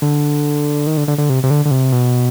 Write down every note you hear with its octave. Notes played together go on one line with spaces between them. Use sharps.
D3
D#3
D3
D3
D3
C3
C3
D3
D3
C3
B2